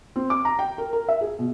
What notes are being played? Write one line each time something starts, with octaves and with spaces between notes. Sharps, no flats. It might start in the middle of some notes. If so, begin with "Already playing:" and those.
C4
D6
A#5
G5
A#4
A#4
E5
G#4
B2